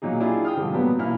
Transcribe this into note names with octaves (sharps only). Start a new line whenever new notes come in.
A#2 F#3 D#4 G#4
D4 E4 F4 G4 G#4
G5 D#6 F6
G#2 D3 F3 G3
A#2 F#3 G3 B3
A1 A#2 E4 F6